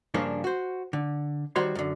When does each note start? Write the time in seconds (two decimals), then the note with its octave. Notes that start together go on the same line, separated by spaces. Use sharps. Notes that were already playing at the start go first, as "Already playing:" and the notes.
0.14 G2 C#3 F3 A#3 C#4 D4
0.44 F#4 C5
0.93 D3
1.56 D#3 G3 F#4 C5 C#5 C6
1.75 F#2 D3